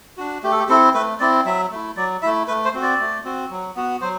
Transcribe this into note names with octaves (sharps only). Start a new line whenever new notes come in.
D4 F#4
A3 G4
A4
G4
C4 E4 A4
A3 B4
C4 E4 D5
F#3 E5
A3 E4
F#3 D5
A3 E4 E5
A3 B4
C5
C4 F#4
D5
A3
C4 F#4
F#3
B3 F#4
F#3 C5